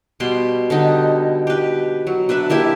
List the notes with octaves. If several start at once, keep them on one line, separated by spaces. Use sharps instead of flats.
B2 G3 B5 C6
D3 G3 D#4
G4 B4
F#3
D4 B4 E5 B5
A#3 E4 G4 E5